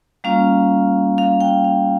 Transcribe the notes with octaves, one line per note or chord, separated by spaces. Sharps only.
G3 A#3 C#4 F4 F5
F5
G5
F5